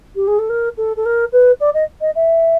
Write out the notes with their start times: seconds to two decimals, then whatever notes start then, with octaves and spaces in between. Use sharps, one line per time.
0.15 G4
0.27 G#4
0.39 A4
0.49 A#4
0.77 A4
0.97 A4
1.05 A#4
1.32 B4
1.60 D5
1.74 D#5
2.01 D#5
2.15 E5